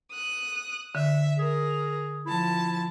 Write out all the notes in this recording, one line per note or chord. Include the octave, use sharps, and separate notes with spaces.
D#6 F#6
D3 E5
G#4 A#4
F3 E4 A5